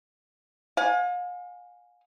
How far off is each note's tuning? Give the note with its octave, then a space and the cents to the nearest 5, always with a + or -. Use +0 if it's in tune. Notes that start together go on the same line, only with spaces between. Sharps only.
F5 +40 G#5 +0